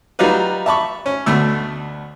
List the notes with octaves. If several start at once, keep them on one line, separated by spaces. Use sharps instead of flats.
F#3 G3 D#4 F4 B4
E5 A5 B5 C#6
C#4
D2 B2 A3 E6